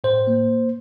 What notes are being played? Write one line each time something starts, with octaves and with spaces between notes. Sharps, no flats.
A2 C5
A#3